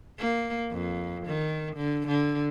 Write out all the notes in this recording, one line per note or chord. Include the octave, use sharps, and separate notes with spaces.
A#3
F2
D#3
D3
D3